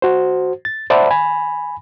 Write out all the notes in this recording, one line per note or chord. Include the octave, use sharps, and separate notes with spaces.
F#4 C5
A6
C5 D5 E5 F#5 A5 B5
G#5 B5